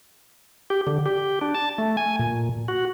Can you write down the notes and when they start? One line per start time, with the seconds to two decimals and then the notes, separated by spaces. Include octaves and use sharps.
0.70 G4
0.87 D3
1.06 G4
1.41 D4
1.55 A5
1.78 A3
1.97 G#5
2.19 A#2
2.68 F#4